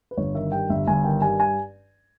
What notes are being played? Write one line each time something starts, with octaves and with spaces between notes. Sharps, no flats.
B4
G1 C#5
D#3 E5
G2 G5
G1 E5
G1 G#5
D#3 G5
G2 G#5
G#5